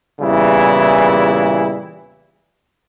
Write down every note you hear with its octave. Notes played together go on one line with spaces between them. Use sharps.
E2 A#2 C#3 E3 G3 E4